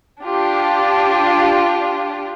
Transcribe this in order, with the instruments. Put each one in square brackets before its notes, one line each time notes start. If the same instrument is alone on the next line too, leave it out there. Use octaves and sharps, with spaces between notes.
[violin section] D4 F4 G4